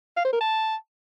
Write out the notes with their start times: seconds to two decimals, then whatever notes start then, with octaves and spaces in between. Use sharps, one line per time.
0.17 F5
0.25 C5
0.33 A#4
0.41 A5